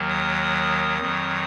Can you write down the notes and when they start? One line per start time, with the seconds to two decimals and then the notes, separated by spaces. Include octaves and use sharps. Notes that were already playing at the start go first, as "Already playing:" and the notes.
Already playing: D#2 D#3 F#3
0.10 D#6
1.00 F2 D#3 F#3